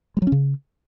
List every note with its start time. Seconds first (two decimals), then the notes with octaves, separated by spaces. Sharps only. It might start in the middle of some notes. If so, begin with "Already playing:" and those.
0.17 G#3
0.22 F#3
0.27 C#4
0.32 C#3